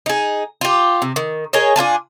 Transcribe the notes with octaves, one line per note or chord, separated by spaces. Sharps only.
D#4 G#4
F4 G4
C3
D#3
G#4 A#4 C#5 D#5
D4 F4 G#5 A5